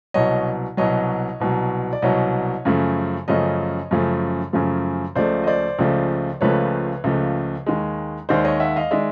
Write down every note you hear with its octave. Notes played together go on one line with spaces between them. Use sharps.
C2 B2 F#3 C#5 D#5
C2 B2 F#3 C#5 D#5
C2 B2 F#3
D5
C2 B2 F#3 C#5 D#5
F#2 C#3 F3 A3
F#2 C#3 F3 A3 C#5 D#5
F#2 C#3 F3 A3
F#2 C#3 F3 A3
C#2 C#3 F3 A3 C5 D5
D#5
C5 D5
C#2 C#3 F3 A3
C#2 C#3 F3 A3 B4 C#5
C#2 C#3 F3 A3
D#2 D#3 G#3
D#2 D#3 G#3 C5 D5
C#5 D#5
E5 F#5
D#5 F5
D#3 G#3 D5 E5